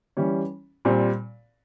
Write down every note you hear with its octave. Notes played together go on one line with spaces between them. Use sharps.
E3 G3 C#4
A#2 G3 C4